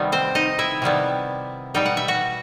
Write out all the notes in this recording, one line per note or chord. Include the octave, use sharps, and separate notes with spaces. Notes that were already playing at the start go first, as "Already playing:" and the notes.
Already playing: C3 D#3 G3 B3
C4 C5
D#4 D#5
E4 E5
C3 D#3 G3 B3
B2 G3 D#4 G5
F#5
E5
F#4 F#5